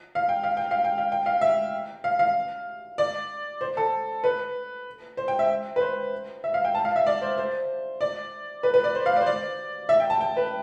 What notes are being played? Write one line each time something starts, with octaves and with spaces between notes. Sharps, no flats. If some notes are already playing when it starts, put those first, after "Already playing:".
F5
G5
F5
G5
F5
G5
F5
G5
F5
E5
F5
F5
D5
C5
A4
B4
C5
G5
E5
B4
C5
E5
F5
G5
A5
F5
E5
D5
C5
C5
D5
B4
B4
D5
C5
F5
D5
C5
D5
E5
G5
A5
G5
B4